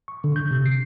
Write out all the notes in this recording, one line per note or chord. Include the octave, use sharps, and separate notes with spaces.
C#6
D3
G6
C3
C7